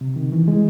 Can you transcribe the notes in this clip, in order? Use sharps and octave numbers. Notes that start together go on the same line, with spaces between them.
C3
D#3
E3
G#3